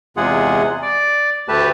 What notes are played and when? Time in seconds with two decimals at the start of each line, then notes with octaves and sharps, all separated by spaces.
0.17 E2 C3 G#3 F4 G#4 F#5
0.82 D5
1.48 D2 A3 G4 B4 A5